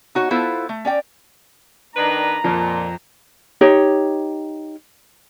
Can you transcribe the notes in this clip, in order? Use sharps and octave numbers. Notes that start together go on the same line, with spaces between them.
D#4 F#4 C#5
B3 E4 F4 A4 C5
A3
C#4 D5 G5
D#3 D4 B4 A#5
F2 A#2
D#4 G4 C#5